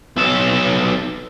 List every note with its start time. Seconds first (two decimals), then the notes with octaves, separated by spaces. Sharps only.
0.16 B1 A4